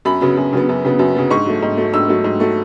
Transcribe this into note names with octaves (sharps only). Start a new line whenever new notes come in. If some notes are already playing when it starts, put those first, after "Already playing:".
F#2 B5
C#3 F#3 B3
F#2
C#3 F#3 B3
F#2
C#3 F#3 B3
F#2
C#3 F#3 B3
G#2 C#6
F#3 A3
G#2
F#3 A3
G#2 E6
F#3 A3
G#2
F#3 A3